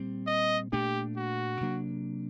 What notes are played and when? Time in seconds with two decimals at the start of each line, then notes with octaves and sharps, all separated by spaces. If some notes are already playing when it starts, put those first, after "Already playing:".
Already playing: A#2 G3 C4
0.27 D#5
0.72 A#2 A3 D4 G4
1.17 F#4
1.61 C3 F#3 A#3 D4